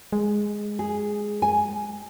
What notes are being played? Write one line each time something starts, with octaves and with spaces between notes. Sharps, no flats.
G#3
G#4
G#5